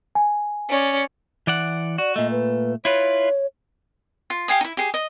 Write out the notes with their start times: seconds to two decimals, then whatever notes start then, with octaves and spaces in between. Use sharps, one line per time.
0.15 G#5
0.70 C#4 D5
1.47 E3 D5 F#5
1.98 F#4 D5
2.16 A#2 A3 D#5
2.31 B4
2.85 E4 F4 B4 C#5
4.30 F4
4.48 G4 F5 G#5 D#6
4.61 D#4 E4
4.77 G4 G#4
4.94 D#5